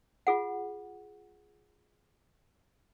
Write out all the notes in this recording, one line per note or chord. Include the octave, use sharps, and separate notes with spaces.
F4 G#4 F#5